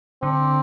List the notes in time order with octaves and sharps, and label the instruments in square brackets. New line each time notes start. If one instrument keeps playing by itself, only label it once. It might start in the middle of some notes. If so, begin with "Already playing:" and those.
[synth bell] D3 [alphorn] C4